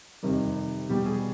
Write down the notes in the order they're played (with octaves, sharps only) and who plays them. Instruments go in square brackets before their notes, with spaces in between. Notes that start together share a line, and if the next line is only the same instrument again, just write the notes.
[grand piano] F2 C3 D#3 G3
B2 G3 G4
G#4